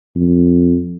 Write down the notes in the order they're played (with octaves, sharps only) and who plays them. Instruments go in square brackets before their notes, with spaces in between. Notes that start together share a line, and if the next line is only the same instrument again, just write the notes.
[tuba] F2